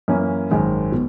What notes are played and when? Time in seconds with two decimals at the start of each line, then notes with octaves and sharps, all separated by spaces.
0.08 F#2 E3 A#3 C#4
0.50 G#1 F#2 D#3 G#3
0.92 B2